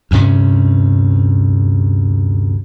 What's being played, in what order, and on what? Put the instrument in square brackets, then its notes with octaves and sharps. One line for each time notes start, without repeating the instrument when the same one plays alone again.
[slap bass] D2 G2 C3 C#4